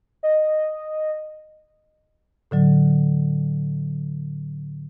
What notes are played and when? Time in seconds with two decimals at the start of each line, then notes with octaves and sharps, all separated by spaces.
0.23 D#5
2.51 A2 D3 F#3